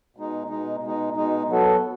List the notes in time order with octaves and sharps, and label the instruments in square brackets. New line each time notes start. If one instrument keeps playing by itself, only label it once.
[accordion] B2 G#3 D#4
B2 G#3 D#4
B2 G#3 D#4
B2 G#3 D#4
F#3 B3 F#4 A4